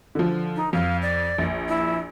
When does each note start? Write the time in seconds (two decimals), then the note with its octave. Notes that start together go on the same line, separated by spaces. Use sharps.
0.15 D3 F3
0.56 D#4
0.73 F2 F5
1.02 D5
1.38 A#1
1.68 E4